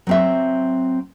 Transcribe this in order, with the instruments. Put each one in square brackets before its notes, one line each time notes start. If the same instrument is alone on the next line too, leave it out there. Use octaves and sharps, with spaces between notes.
[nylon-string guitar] F#3 C4 E5